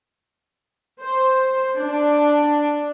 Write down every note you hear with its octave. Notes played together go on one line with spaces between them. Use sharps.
C5
D4